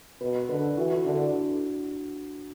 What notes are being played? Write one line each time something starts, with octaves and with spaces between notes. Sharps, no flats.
B2 B4
D3 B4
A4
E3 F#4
E4
D3 D4